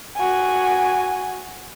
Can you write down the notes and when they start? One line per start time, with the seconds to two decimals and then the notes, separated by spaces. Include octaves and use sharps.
0.16 F#4 G#5